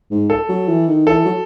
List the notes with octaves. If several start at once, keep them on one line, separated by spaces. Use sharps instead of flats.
G#2
A4
F#3
E3
D#3
E3 A4
F#3